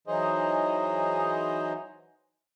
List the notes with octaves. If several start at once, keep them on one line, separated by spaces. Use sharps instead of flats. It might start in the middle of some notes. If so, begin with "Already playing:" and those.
E3 F#3 D#4 G#4 C5 D#5